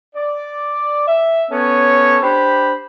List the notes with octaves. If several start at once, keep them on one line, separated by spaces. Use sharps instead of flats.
D5
E5
B3 C#4 A4 C#5
D4 G4 C5 B5